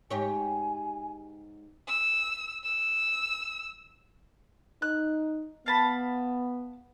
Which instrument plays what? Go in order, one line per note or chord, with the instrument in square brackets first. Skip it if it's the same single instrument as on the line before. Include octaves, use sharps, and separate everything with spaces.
[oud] G#2 G4 C#5 [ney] G#5
[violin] E6
E6
[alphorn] D#4 [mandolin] F#6
[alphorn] B3 [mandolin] F5 A5 B5